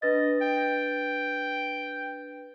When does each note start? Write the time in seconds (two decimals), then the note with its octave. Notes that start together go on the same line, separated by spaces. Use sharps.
0.02 D4 B4 D#5 A6
0.41 G5